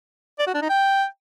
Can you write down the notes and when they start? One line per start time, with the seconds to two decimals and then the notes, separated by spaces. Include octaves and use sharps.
0.39 D5
0.47 F#4
0.54 D4
0.62 D#4
0.69 G5